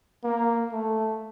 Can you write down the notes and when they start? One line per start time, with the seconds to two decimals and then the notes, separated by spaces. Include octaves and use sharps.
0.24 A#3
0.72 A3